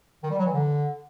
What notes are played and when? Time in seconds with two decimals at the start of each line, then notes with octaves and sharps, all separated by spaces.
0.23 D#3
0.31 G3
0.39 F#3
0.46 E3
0.54 D3